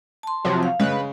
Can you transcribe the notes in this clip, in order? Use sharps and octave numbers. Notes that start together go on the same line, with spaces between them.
A5 C6
C3 F3 F#3
F5
C#3 G#3 B4